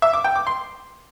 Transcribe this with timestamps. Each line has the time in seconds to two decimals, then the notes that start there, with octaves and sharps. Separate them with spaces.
0.02 E5
0.13 D6
0.24 G5
0.36 D6
0.47 C6